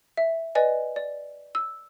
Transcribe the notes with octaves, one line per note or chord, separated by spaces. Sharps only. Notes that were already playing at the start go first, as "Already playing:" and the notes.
E5
B4 D5 D#5 G#5
D5
E6